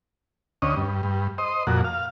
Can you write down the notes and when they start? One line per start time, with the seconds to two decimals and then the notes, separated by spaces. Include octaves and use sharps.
0.62 D2 C#4 D#5
0.76 G2
1.03 G2
1.38 C5 D#5
1.67 F2 A#2 F#4
1.84 F5